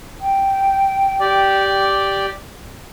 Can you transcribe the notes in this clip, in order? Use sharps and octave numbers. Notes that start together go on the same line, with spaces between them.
G5
G4 D5